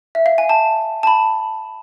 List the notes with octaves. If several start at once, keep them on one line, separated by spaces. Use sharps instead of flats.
E5
F5
G#5
A5
A5
B5